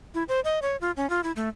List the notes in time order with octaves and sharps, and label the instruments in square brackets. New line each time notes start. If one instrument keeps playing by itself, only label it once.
[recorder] E4
C5
D#5
C#5
F4
C#4
F4
E4
A3